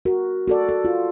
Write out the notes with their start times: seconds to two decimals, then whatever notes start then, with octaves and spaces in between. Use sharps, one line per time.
0.05 F#4 A#4
0.48 F#4 A4 D5
0.69 A4
0.85 F4